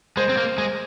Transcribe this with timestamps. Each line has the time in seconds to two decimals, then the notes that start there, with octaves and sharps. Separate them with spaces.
0.17 G#3 C5
0.29 C4
0.37 A#3
0.58 G#3